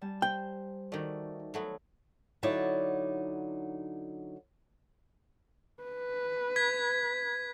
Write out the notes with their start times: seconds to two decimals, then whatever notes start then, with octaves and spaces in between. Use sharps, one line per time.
0.01 G3 G#5 A5
0.22 C5 G5
0.92 D#3 A3 F#4 D5
1.54 F#3 A3 B3 F#5
2.43 D3 F#3 D#4 E4 C#5 D5
5.83 B4
6.56 G#6 B6